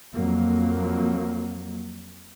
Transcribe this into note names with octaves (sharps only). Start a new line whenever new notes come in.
F2 F#3 A#3